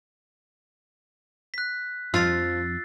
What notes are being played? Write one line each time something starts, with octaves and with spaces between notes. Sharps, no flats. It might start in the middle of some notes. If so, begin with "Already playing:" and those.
F#6 B6
F2 F3 F4 E6 A6 C7